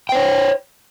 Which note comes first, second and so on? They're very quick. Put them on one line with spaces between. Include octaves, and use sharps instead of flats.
G5 C5 C#5